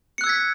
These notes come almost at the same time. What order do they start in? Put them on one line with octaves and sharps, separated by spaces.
C#7 F#6 E6 G#6 B6